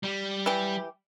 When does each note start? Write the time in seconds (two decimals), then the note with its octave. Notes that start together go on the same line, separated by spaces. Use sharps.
0.04 G3
0.46 E3 G4